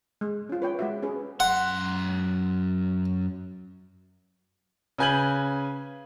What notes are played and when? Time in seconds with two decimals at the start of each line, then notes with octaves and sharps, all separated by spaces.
0.21 G#3
0.49 C#4 F4
0.62 B4 C#5 G5
0.79 G#3 F#4 E5
1.02 C#4 G#4 B4
1.40 F#2 F#5 C6
4.98 C#3 B4 G#5 G6 G#6 F#7